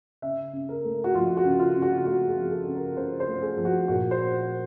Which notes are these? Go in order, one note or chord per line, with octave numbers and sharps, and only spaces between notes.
C#3 E5
C#3
A#4
A3
F#4
F3 F4
F#4
C#3
F4
C#3
F#4
A3 F#4
G#4
F3
A4
C#3
A#4
C#3 C5
C5
A3
G#4
F3
F#4
A#2 F#4
C5